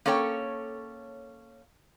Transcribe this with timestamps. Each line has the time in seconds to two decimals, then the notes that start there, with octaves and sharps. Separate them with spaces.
0.06 A#3 C#4 A4 C#5 G5